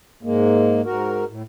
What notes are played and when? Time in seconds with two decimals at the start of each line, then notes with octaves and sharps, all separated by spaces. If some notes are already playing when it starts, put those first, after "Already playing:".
0.23 G#2 G#3 A#3
0.84 G#2 F#4 A#4
1.28 A2